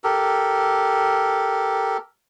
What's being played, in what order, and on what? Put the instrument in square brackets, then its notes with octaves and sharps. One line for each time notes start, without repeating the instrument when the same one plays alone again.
[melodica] G4 A4 A#4